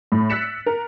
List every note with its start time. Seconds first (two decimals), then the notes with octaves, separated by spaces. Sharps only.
0.12 A2
0.30 E6 F#6 A6 B6 C#7 E7
0.66 A#4